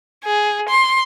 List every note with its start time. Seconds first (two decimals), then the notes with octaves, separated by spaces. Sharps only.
0.24 G#4
0.69 C6